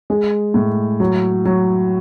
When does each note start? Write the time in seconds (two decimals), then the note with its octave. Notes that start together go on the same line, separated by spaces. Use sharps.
0.10 G#3
0.54 A2
1.00 F#3
1.45 F#3